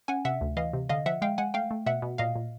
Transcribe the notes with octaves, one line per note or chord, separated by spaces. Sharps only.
C#4 F#5 G#5
C3 E5 F#5
D2
E3 D#5 F5
C3
D3 D#5 F5
F3 E5 F#5
G#3 F5 G5
G#3 F#5 G#5
A3 F5 G5
A3
B2 E5 F#5
B2
A#2 D#5 F5
A#2